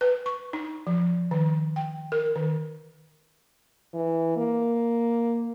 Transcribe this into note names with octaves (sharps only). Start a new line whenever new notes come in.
B4
C#6
D#4
F3
D#3
G5
A#4
D#3
E3
A#3